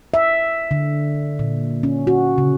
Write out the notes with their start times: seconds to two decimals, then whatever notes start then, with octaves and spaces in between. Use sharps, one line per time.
0.14 E5
0.71 D3
1.39 A#2
1.83 C#4
2.07 F#4
2.38 C#3